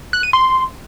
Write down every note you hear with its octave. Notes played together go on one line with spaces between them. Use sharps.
F#6
D#7
C6